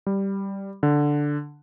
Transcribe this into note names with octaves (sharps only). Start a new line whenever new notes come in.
G3
D3